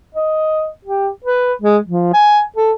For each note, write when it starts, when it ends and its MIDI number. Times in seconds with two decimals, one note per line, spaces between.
0.15 0.69 75
0.85 1.10 67
1.24 1.53 71
1.62 1.78 56
1.87 2.11 53
2.13 2.42 80
2.56 2.72 69